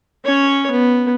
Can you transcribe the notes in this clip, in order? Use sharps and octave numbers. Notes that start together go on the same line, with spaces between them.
C#4 C#5
B3